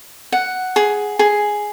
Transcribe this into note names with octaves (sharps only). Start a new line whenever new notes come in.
F#5
G#4
G#4